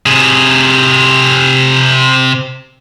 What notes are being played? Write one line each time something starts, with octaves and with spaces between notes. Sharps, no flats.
C3 G#4